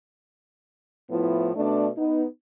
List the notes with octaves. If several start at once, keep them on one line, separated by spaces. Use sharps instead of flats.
A2 F3 B3 E4
B2 A3 D4 D5
B3 D#4